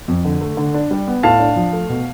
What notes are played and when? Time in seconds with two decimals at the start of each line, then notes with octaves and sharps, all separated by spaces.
0.08 F2
0.25 D3
0.41 A3
0.57 D3
0.74 D4
0.91 G3
1.08 B3
1.23 A2 F5 A5
1.40 D4
1.56 F3
1.73 A3
1.89 B2